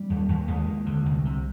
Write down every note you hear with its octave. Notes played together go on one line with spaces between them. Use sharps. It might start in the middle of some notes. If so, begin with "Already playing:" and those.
Already playing: G3
D#2
D#2
D#2 G#3
D#2
D3
C2
C3